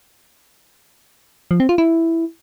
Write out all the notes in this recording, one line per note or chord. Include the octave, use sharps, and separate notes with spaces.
F3
C4
F4
E4